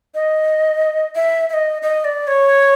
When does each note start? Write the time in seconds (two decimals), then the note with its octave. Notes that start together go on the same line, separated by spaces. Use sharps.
0.15 D#5
1.16 E5
1.49 E5
1.54 D#5
1.82 D#5
2.04 D5
2.27 C#5